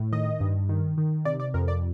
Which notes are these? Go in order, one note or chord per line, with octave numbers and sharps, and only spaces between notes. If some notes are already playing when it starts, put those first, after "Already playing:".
Already playing: A2
D#3 D#5
G2
D#3
D#3
C3 D5
D5
F2 A#4
D5